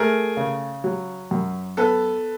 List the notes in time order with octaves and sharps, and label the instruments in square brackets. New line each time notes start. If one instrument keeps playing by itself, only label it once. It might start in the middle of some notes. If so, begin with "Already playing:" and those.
Already playing: [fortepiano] A3 [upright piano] G#4 A#4
[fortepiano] C#3
F#3
F#2
[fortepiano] B3 [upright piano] A4 B4